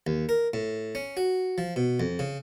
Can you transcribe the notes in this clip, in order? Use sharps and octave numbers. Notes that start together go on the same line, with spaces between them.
D#2
A#4
A2
C#4
F#4
F3
B2
F2
C#3